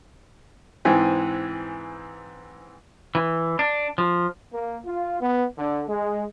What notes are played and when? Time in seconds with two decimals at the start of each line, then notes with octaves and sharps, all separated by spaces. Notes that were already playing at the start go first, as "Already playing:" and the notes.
0.85 G#2 E3 C4 G#5
3.15 E3
3.59 D4
3.98 F3
4.53 A#3
4.85 F4
5.21 B3
5.58 D3
5.89 G#3